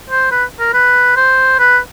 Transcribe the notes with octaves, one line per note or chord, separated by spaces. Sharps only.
C5
B4
A#4
B4
C5
B4